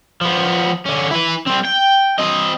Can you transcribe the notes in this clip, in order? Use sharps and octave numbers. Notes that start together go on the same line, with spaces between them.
F3 B3
D3 C#4
E4 B4
G3 C4
G5
C4 D#5